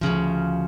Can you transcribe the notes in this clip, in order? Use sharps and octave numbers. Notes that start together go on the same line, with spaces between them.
D2 C#3 F3